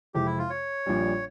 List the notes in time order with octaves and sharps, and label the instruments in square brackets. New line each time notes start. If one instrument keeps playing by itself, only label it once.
[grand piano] F2 C3 E3 G#3 [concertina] G4
[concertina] E4
F4
C#5
[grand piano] A#1 A#2 G3